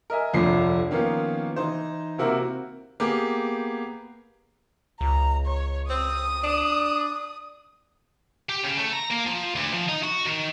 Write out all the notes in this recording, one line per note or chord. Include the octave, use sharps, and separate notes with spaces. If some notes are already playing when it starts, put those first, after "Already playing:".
A#4 D#5 E5 G#5
G1 C2 F2 F3 D4 C7
D#3 F3 A#3 B3 C#4 F4
E3 D#4 C5
C3 A#3 C4 E4 F#4 A#4
A#3 B3 G4 G#4
C#2 A#5
C#5
C4 D#6
D4
G4
C#3
A3
A#5
A#3
F3
D2
F3
D#4
F#4
D#3